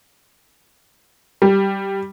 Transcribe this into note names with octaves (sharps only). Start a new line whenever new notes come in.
G3